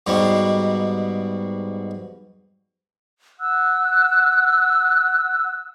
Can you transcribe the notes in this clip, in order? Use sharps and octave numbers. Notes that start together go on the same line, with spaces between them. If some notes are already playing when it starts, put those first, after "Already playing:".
G#2 B2 G3
F#5 E6 F#6